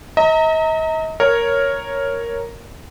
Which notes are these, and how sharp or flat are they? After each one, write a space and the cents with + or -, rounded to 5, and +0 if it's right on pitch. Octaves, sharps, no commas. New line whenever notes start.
D#5 +45 A#5 -25
A#4 +0 C#5 +0